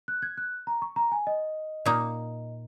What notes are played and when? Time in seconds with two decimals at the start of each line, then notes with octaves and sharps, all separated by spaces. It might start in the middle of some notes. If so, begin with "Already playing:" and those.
0.08 F#6
0.22 G#6
0.38 F#6
0.67 A#5
0.82 C#6
0.96 A#5
1.12 G#5
1.27 D#5
1.86 A#2 A#3 D#4